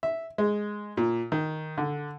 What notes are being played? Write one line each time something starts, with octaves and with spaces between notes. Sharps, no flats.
E5
G#3
A#2
D#3
D3